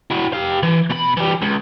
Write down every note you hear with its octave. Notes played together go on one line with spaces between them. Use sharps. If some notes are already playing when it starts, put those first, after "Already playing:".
E4 F#4
G4 F5
E3
B2 B5
E3 G3
C#2